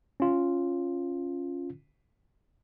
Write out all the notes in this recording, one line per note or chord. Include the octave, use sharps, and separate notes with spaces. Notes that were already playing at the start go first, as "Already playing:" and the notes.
C#4 F4